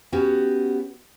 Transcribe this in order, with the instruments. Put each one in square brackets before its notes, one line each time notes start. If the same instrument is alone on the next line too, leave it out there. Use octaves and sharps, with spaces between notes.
[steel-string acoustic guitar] B3 C#4 F#4 G4